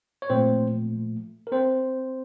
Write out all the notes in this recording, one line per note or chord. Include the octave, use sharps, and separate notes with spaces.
C#5
A#2 F3 A3 C4 C5
A#4
C4 C5